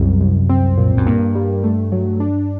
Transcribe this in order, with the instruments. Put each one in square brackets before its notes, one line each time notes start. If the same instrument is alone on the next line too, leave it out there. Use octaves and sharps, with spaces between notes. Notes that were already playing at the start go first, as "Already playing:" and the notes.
Already playing: [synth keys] C2 [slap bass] F#2
[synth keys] C2
C4
A#2
[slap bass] F#2
[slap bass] G2 [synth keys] A#3
[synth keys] G3
A3
F#3
D4